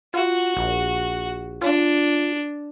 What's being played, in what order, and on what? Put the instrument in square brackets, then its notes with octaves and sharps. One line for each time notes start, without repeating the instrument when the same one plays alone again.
[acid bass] F4 [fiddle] F#4
[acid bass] A#1
[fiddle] D4 [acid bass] F4